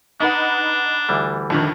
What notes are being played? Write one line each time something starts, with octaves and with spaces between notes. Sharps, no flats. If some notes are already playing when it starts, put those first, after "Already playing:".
D4 D#4 B4 F#5
D2 E3 G3
F2 D3 D#3